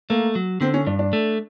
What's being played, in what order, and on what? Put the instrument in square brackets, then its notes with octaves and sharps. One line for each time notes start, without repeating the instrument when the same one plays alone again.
[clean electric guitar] A3 [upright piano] A#3
[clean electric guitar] F#3
[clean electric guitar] D3 [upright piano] C4
[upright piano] C#4
[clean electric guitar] G2 [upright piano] D4
[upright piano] D4
[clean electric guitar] A3